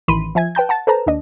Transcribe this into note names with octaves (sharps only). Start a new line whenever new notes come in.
A1 D#3 E3 B5 C6 D#7
F3 E5 G#5 G#6
B4 G5 A5 G6
F#5 A5 A6
A4 B4 C5 A5 A#5
D#2 D4 D#5